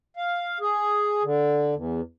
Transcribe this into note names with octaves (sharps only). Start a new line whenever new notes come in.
F5
G#4
D3
E2